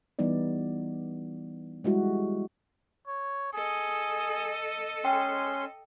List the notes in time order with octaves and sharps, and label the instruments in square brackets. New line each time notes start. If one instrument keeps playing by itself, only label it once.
[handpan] E3 G3 B3 D#4 D5
G3 G#3 E4 F#4
[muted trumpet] C#5
[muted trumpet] G#4 [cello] A4 D#5
[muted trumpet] G#3 [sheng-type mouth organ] C#4 C6 [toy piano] G5